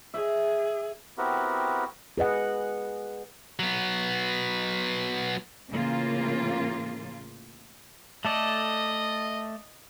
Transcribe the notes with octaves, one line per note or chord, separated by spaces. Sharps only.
G#4 D#5 E5
B3 C4 E4 F#4 G4 A#4
G#4 B4 D#5 F#5
F#3 B3
A2 C#3 E3 A#3 F4
A3 A4 D5 D#5